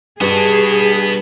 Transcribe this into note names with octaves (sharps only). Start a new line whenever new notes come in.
G2 B3 F#4 G#4